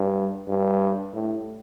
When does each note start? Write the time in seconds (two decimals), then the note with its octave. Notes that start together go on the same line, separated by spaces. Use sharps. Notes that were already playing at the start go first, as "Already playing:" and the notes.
Already playing: G2
0.48 G2
1.14 A2